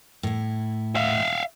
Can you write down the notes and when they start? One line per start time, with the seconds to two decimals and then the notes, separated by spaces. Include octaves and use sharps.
0.23 A2 E4
0.96 E5 F5